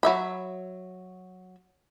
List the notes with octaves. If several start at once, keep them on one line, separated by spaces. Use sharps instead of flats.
F#3 E5 B5